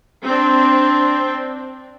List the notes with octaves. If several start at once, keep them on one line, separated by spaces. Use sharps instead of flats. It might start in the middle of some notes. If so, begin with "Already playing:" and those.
C4 D4